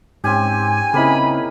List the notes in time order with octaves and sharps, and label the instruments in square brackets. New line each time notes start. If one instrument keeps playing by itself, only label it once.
[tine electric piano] G#2 [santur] C4 C#4 G4 [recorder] G#5
[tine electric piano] C#3 C4 E4 [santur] A#3 C#4 D#4 [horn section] B5